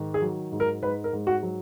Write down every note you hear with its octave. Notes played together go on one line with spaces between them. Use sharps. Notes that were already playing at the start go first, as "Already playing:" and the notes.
Already playing: G#2 D#3
G#4
F#3
G#2
A#4
G#2 B4
A#4
G#2
F#4
F#3